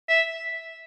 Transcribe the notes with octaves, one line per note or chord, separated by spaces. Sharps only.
E5